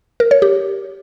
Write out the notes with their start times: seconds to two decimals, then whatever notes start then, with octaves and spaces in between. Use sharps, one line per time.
0.20 A#4
0.31 C#5
0.42 G4